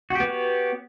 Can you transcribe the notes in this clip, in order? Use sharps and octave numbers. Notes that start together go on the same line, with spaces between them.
B3 F#4 G4 C#5